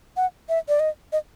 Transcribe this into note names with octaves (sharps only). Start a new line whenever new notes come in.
F#5
E5
D5
D#5
D#5